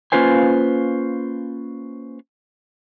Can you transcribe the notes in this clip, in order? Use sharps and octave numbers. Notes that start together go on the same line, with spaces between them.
A#3 C#4 F4 B4 C5 G#5